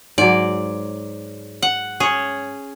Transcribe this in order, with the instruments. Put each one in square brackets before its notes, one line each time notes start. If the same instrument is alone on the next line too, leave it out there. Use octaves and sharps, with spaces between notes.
[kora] G#2 F#3 [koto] D5
[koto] F#5
[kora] C#4 C#5 [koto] G#4